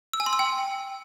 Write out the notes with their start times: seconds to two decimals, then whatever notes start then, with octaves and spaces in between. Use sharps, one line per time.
0.13 E6
0.20 G#5
0.26 C6
0.33 E6
0.39 G5